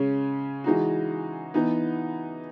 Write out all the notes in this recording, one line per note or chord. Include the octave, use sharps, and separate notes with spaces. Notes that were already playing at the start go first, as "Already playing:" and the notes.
Already playing: C#3 G#3 C#4
E3 G#3 D#4 F#4
E3 B3 D#4